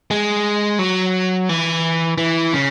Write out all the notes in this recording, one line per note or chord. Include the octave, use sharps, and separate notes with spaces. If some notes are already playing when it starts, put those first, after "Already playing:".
G#3
F#3
E3
E3
C#3